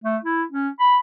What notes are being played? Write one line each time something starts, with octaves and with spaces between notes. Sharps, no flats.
A3
E4
C#4
B5